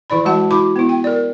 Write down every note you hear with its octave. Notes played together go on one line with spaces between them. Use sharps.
E3 E4 D5 B5
G#3 F#4 F#5 A5
E4 F#4 B5 D6
B3 E4
G5
A#4 D5